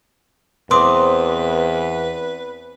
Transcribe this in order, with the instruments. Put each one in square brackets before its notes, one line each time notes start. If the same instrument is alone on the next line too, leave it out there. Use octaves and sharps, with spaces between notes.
[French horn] E2 [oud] C4 [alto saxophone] B4 [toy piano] C6 D6 D#6